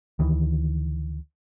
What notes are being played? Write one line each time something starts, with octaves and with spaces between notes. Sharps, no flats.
D2 D#3 E3